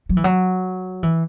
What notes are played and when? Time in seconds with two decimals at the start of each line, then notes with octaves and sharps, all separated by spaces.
0.09 F#3
0.17 E3
0.24 F#3
1.03 E3